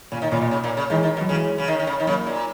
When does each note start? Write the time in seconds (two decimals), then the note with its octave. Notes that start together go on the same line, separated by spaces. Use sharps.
0.12 A#2 C#3
0.22 D#3
0.32 A#2 C#3
0.42 B2
0.51 C#3
0.64 A#2
0.77 C#3
0.90 D#3 E3 G#3
1.03 D#3
1.17 B2
1.21 F#3
1.29 C#3 E3 G#3
1.58 C#3
1.68 D#3
1.80 D#3
1.87 C#3
2.00 D#3
2.07 C#3 F#3 A#3
2.26 A#2